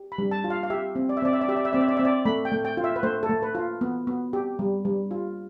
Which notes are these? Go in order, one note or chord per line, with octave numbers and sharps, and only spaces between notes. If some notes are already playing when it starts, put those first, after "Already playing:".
Already playing: G4
B5
G3
A5
F4
F5
F5
G4 E5
C4
D5
E5
C4 D5
E5
D5
G4 E5
D5
E5
C4 D5
E5
D5
C4 E5
D5
A3 B5
G5
A3
G5
F4
E5
B4
A3 C5
A4
A3
B4
F4
B3
B3
G4
G3
G3
F4